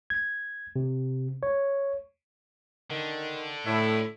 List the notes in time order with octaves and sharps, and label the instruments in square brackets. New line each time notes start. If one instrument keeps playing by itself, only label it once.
[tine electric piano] G#6
C3
C#5
[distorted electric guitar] D3 [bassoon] D#3
[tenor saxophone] A2 [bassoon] A3 [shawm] E4